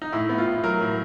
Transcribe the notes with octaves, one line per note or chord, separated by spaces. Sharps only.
D#4
A2 E4
B3
F4
A2
F#3 A#4
A2